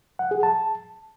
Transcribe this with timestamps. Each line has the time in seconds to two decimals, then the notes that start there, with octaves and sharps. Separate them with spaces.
0.19 F#5
0.31 G#4
0.43 A5